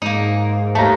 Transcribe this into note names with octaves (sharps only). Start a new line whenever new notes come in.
G#2 A#3 D#4
D#2 A3 A5 A#5